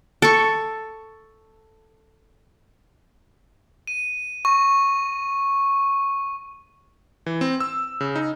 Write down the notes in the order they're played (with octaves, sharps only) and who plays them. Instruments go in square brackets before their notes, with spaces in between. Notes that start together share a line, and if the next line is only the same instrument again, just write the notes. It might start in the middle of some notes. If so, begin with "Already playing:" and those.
[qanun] A4 C#6
[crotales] D#7
C#6
[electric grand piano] E3
C4
E6
C#3
D#4